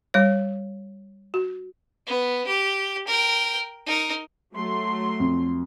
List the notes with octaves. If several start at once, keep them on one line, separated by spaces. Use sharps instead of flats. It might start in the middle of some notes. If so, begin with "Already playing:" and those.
G3 C#5
F#4
B3
G4
A#4 G5
D#4 A#4
F#3 A3 C6
F2